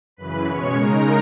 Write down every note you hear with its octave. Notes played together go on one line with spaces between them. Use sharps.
F#2 C#3 E3 B4 B5
B2 G#3 C#4 C#5 C#6
C#3 G#3 D#4 A#4 A#5